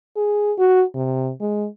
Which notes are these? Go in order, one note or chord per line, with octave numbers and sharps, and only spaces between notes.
G#4
F#4
C3
G#3